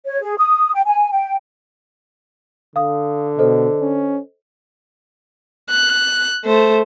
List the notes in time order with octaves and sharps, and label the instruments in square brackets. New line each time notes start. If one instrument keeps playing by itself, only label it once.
[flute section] C#5
G#4
D#6
G5
G#5
G5
[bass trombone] D3 [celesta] F5 D#6
[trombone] B2 [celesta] A4 C5 D#5
[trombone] C#4
[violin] F#6
A3 C5